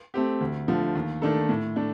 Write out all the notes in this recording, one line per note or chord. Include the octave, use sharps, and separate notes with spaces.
A3 C4 G4
D2
D3 F3 A3
D#2
D#3 A3 D4 A4
A2
A3 D4